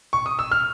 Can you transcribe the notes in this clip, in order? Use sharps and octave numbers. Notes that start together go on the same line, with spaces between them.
C#6
D#6
E6
F6